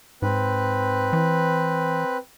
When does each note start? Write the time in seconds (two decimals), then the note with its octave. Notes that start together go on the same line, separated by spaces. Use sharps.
0.22 G#2 C4 B4
1.13 E3